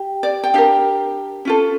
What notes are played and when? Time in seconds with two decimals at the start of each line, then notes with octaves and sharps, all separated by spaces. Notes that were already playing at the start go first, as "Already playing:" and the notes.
Already playing: G4
0.23 D5
0.44 G5
0.54 D4 G4 A#4 F5
1.45 C#4 F4 A4